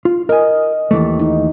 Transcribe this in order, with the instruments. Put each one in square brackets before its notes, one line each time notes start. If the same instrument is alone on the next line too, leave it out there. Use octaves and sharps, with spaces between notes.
[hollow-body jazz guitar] F4
[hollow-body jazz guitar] A#4 G#5 [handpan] D#5
[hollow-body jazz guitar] D#2 E3 A3
[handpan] D#4